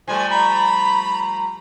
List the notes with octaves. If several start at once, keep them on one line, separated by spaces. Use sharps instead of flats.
F3 G3 A3 G#5
A#5 B5